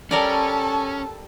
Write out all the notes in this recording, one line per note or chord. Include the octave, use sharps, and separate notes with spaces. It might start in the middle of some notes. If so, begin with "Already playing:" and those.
G3 C#4 A4 A#4 D5 A5